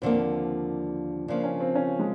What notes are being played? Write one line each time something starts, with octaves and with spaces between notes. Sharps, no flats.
D#2 D3 F3 A#3 C4
C#3 F3 A#3 D4
C#4
C4
C#4
G#3